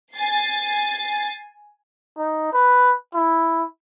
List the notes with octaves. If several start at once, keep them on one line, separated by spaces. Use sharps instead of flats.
G#5 A6 C7
D#4
B4
E4